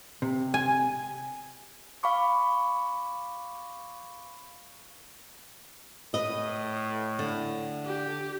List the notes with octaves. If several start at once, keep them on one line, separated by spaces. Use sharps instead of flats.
C3
G#5
F5 B5 C#6 D6
A2 B4 D#5
D3
G4